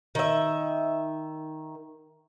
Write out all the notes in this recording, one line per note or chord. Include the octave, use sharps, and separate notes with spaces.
D#3 E5